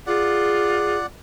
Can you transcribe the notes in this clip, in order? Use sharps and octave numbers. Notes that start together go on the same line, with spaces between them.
F4 G#4 D5 F#5